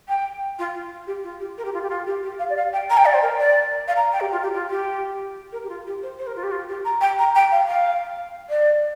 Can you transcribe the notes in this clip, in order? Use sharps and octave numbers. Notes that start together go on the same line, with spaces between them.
G5
F4
G4
F4
G4
A#4
G4
F4
G4
F4
G4
G4
F5
D5
F5
G5
A#5
G5
D5
C5
A#4
D5
F5
A#5
G5
G4
F4
G4
F4
G4
A#4
G4
F4
G4
C5
C5
A#4
F4
G4
F4
G4
A#5
G5
A#5
G5
F5
F5
D5